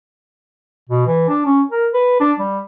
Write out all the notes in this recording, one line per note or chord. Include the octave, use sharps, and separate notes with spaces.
B2
E3
D4
C#4
A#4
B4
D4
G3